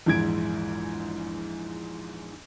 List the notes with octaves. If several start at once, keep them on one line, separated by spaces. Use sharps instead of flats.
A#1 E2 G#2 E4 G#6 D7